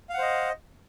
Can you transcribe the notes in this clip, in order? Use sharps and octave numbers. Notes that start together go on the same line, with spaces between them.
C5 D#5 F5 F#5